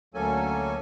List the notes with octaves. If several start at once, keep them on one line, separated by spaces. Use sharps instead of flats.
D2 F#3 A#3 C#4 A4 G#5